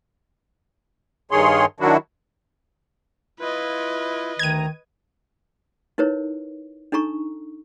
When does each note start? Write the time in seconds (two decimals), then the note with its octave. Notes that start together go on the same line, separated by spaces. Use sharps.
1.31 G2 D#3 G#4 C#5 C6
1.80 D#3 F#3 D4 E4 F#4
3.40 E4 F4 B4 D#5
4.39 D2 D#3 A#5 G#6 D#7
5.98 D#4 E4 A#4 B4 C#5
6.92 D4 D#4 A4 A#5 C#6